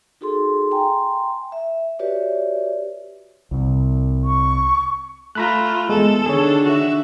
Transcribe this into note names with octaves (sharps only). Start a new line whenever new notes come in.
D#4 F#4 G#4 A4 C6
G5 G#5 A#5 C6
E5
F#4 G4 B4 C#5 D5 E5
C2 C3
C#6
A3 F4 A#5 B5 F#6
E2 G#3 A4
D3 D#3 D4 G#4 C#5
F#4 E5